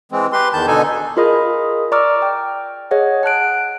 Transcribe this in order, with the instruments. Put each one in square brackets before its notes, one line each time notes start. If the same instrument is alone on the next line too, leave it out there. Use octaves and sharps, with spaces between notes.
[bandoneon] E3 G#3 C4
G4 B4 C6
E2 D#3 A5 G6
B2 D3 D#4 A4 G#5
[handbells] F4 G#4 A#4 D#5 B5 D#6
D5 A#5 C#6 D6 E6 F6
G5
G#4 C#5 D#5 F#5
F#5 A5 F#6 D7